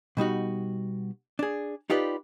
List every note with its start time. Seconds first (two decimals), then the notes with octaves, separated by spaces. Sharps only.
0.17 B2 G3 D#4 F#4
1.39 D4 G#4
1.90 D#4 F4 G4 B4 D5